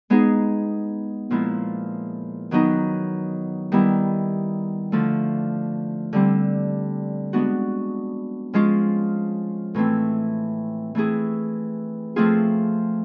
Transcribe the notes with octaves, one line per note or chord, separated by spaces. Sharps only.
G#3 B3 D#4 G#4
A#2 F3 G#3 B3 E4
D#3 F#3 B3 D#4
D#3 G3 B3 E4
D3 F3 A3
D3 G3 C4
G#3 B3 D4 F#4
F3 G#3 C#4 F4
A2 E3 A3 C4
E3 A3 C4 E4 G#4
F3 A3 C4 F4 G#4